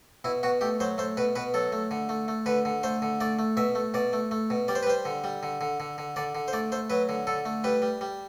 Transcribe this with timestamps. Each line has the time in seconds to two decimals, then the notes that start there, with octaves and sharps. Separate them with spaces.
0.24 B2 E4
0.43 B2 F#4
0.61 A3 G4
0.80 F#3 C5
0.98 A3 C5
1.17 B2 B4
1.36 B2 B4
1.54 F#3 A4
1.72 A3
1.91 D3
2.09 A3
2.28 A3
2.46 D3 B4
2.65 D3
2.83 A3 C5
3.02 D3
3.20 A3 D5
3.39 A3
3.57 B2 E5
3.75 A3
3.94 B2 D5
4.13 A3
4.31 A3
4.50 B2
4.68 G3 D5
4.75 C5
4.83 B4
4.87 G3 C5
5.05 D3
5.24 G3
5.43 D3
5.61 D3
5.80 D3
5.98 D3
6.16 D3 D5
6.35 D3
6.48 C5
6.53 A3 D5
6.72 A3 C5
6.90 F#3 B4
7.09 D3
7.27 D3 A4
7.45 A3
7.64 G3 B4
7.82 G3
8.01 G3